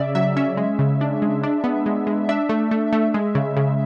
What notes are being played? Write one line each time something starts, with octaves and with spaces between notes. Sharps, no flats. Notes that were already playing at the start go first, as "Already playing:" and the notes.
Already playing: C#3 C#4 D5 E5
F#3 E5
C#4 E5
G#3
C#3
D4
G#3
D4
B3
G#3
G#3
D4 E5
A3
A3
A3
G#3
C#3
C#3